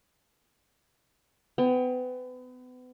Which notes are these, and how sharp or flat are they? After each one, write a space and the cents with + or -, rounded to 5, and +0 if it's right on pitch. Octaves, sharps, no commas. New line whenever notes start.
B3 +35 G5 +35